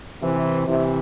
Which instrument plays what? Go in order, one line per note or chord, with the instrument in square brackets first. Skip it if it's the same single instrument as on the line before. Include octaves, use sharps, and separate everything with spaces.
[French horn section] C3 E3
C3 E3